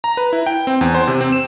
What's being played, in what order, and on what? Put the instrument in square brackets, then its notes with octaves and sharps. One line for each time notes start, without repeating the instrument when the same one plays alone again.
[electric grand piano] A#5
B4
E4
G5
C4
E2
C5
C3
C4
E7